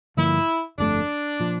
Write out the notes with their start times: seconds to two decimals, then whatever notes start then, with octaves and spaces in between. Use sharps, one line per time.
0.17 G2 D3 F3 A#3 E4
0.78 G1 F2 D3 A3 D4
1.40 A#2 F3